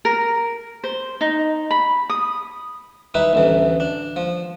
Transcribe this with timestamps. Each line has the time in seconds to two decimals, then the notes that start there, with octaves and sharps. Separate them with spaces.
0.05 A#4
0.84 C5
1.21 D#4
1.71 B5
2.10 D#6
3.14 G3 D#4 E4 B4
3.33 A1 D2 E3
3.80 D4
4.16 F3